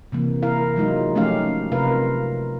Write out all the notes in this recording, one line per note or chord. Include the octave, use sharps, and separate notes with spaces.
C3 E3 A#3
E4 A#4 F5
F#3 G#3 D#4 F4
F3 A3 C#4 D#4 G4 F5
C3 F4 A#4 B4 F5